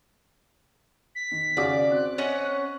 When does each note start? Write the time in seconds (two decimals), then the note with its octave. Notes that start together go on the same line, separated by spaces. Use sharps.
1.15 B6
1.31 D#3
1.57 C#3 F#4 D5 D6
1.91 C4 F#6
2.18 C#4 D#5 F#5